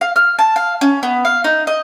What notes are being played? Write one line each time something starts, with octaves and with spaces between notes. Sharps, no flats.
F5
F6
A5
F5
C#4
B3
F5
D#4
D#5